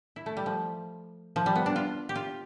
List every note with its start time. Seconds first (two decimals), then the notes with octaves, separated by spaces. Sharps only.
0.16 E4
0.26 A3
0.37 G3
0.46 F3
1.36 F3
1.46 G3
1.55 B3
1.66 D4
1.76 F4
2.09 G4
2.16 F4